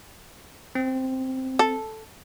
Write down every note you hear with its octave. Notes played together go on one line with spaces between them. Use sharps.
C4
A4